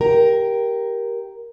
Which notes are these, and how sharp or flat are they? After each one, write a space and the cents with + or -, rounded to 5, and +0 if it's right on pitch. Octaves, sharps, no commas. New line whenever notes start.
G4 -5 A#4 +10 A#5 +0